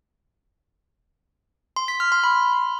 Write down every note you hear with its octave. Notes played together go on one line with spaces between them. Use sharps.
C6
B6
F6
C6
B5